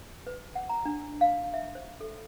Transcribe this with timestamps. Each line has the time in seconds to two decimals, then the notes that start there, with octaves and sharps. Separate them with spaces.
0.27 B4
0.55 F#5
0.69 A#5
0.85 D4
1.21 F5
1.54 E5
1.75 C5
2.01 A4